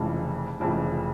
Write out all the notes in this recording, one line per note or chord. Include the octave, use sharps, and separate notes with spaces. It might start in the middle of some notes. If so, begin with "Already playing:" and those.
Already playing: F1 F2 C#3 E3 G#3
F1 F2 C#3 E3 G#3